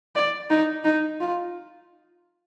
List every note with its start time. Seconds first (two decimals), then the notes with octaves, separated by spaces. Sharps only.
0.16 D5
0.50 D#4
0.85 D#4
1.20 F4